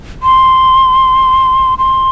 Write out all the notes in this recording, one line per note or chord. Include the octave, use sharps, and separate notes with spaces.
C6
C6